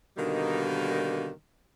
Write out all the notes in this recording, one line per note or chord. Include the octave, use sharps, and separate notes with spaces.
B2 D3 D#3 G3 A#3 D#4